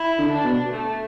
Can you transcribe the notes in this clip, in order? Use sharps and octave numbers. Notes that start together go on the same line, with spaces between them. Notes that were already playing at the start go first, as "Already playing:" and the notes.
Already playing: E4
D3
D4
B2
A3